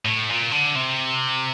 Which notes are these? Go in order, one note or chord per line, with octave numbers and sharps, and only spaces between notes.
A2
A#2
D3
C3